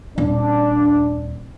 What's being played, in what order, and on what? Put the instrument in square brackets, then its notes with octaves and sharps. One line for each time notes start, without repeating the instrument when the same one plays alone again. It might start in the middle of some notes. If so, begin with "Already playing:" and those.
[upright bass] D#1 [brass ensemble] D4